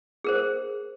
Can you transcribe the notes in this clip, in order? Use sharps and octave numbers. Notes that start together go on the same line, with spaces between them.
G#4 A#4 C5